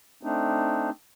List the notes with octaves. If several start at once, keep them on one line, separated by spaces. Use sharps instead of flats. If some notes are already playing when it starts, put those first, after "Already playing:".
A3 C4 D4 D#4